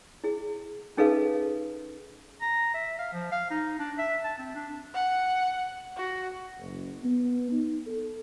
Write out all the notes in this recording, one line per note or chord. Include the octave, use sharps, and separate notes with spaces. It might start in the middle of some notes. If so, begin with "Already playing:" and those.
E4 G#4
C#4 D#4 G#4 A4 B4 F5
A#5
E5
F5
F3
F5
D#4
D4
E5
A5
C4
D4
F#5
F#4
F#1
B3
D#4
A4